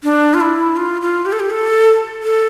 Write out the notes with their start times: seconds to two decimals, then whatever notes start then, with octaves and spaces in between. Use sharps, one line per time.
0.04 D4
0.34 F4
0.41 E4
0.76 F4
1.02 F4
1.26 G4
1.32 A4
1.40 G4
1.50 A4
2.23 A4